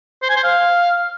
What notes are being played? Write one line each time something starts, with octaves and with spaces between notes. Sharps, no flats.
C5
G#5
C5
F5